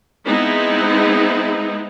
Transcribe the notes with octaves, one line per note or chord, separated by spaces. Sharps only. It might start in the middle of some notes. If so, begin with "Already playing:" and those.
G#3 B3 C4 D#4 E4